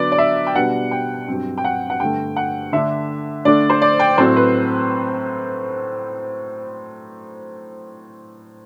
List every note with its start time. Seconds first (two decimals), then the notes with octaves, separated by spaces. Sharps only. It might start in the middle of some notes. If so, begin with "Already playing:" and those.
Already playing: D3 F#3 B3 D4 D5
0.12 D5
0.18 E5
0.47 G5
0.55 B2 G3 B3 D4 F#5
0.91 G5
1.28 G2 F#3 C4
1.58 G5
1.64 F#5
1.90 F#5
2.00 G2 D3 A3 G5
2.36 F#5
2.72 D3 A3 D4 E5
3.45 D3 A3 D4 D5
3.70 C5
3.82 D5
4.00 G5
4.18 A2 F#3 A3 C4 C5
4.36 B4